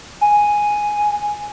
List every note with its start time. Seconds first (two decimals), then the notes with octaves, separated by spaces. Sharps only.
0.21 G#5